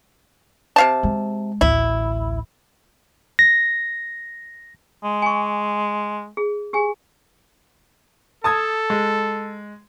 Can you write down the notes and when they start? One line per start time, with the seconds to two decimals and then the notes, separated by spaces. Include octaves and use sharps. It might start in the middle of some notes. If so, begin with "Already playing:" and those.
0.76 C3 F5 A5
1.03 G#3
1.61 A1 D2 E4
3.39 A#6
5.04 G#3
5.22 G#5 C#6
6.37 G#4
6.73 G4 G#4 G#5
8.44 A4 A5 D#6 G#6
8.90 G#3